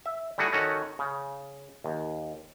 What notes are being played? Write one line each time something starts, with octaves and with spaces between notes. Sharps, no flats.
E5
G3 A3 E4 F#4 G#4
D#3 C#4 F#4 A4 C#5 D#5
C#3
D#2